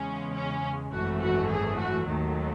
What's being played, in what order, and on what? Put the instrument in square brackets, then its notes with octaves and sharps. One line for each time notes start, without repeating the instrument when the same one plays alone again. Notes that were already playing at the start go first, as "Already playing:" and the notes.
Already playing: [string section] E2 C#3 G#3 C#4
C#4
G#1 F#2 E3 A3 F#4
F#4
G#4
F#4
D#2 D#3 F#3 A3